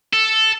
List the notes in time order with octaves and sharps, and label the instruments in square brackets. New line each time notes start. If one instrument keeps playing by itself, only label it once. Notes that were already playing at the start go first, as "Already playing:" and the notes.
[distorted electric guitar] A4